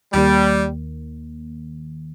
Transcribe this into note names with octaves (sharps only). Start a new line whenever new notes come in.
D#2 D#3 G3 A#3